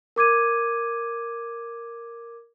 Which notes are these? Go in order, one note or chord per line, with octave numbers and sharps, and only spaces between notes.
A#4 D6 G#6 D#7